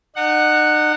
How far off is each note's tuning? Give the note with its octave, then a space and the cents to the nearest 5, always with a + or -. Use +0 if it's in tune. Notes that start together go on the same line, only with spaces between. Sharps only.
D#4 -40 F#5 +0